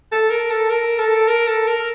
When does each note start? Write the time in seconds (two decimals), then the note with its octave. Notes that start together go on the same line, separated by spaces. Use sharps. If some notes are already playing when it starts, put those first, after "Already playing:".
0.12 A4
0.30 A#4
0.50 A4
0.70 A#4
0.99 A4
1.27 A#4
1.47 A4
1.67 A#4